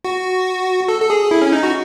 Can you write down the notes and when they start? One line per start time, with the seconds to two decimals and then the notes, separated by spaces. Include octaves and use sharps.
0.04 F#4
0.88 A4
1.01 A4
1.10 G#4
1.31 E4
1.42 C#4
1.53 D#4
1.63 F#4